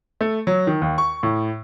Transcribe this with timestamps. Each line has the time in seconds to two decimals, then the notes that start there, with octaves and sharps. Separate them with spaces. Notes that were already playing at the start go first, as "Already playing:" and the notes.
0.21 A3
0.47 F#3
0.67 D#3
0.81 D#2
0.98 C#6
1.23 A2